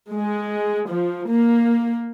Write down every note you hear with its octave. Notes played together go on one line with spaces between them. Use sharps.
G#3
F3
A#3